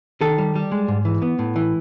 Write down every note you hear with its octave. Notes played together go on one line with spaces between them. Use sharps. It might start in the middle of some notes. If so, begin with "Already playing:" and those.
D#3 A4
G3
G3
G#3
G#2
E3
B3
A2
E3